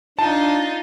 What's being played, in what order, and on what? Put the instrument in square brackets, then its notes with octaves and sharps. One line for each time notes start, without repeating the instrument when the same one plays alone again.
[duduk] D4 [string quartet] D#4 F4 [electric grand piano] A5